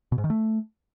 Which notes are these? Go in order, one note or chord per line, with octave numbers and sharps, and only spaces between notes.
B2
G#2
D#3
A3